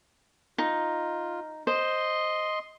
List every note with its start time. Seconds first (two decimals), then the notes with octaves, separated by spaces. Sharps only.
0.58 D#4 F4
1.67 C5 D#5 C6